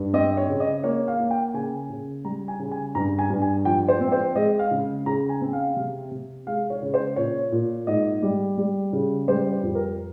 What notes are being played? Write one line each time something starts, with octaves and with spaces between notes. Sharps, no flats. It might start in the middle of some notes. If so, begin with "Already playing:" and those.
Already playing: G2
C4 D#5
C#5
C#3
D#5
A#3 C#5
F5
A#3
G5
C#3 G#5
C#3
G3 A#5
G#5
C#3
G#5
G2 A#5
G#5
G2
G#5
F3 G5
C5
C4
C5
G#3 D#5
F5
C#3
C#3 A#5
G#5
C4
F5
C3
C3
G#3 F5
C#5
C#3
C5
A#2 C#5
A#2
G#2 D#5
G3
G3
C#3
G3 C5
C5
F2
A#4